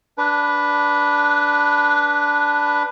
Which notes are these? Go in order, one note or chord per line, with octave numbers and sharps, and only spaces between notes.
D4 B4